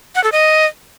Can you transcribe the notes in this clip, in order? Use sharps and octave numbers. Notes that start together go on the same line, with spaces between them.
F#5
A4
D#5